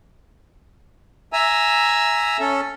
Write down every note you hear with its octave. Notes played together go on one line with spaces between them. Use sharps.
E5 G#5 A#5 E6
C#4 A4